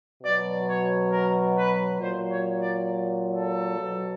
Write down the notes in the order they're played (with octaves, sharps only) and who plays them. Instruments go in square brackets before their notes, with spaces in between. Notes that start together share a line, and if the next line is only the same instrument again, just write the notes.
[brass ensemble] B2 F#3 D5
C#5
A#4
B4
A#2 F#3 C5
C#5
D5
A4
B2 F#3